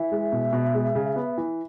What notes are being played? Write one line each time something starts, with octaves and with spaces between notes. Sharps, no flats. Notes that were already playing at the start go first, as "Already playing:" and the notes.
Already playing: E3 E5
G#3
B2
B2
G#3
C#3
B3
E3